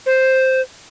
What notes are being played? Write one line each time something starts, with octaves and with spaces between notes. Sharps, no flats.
C5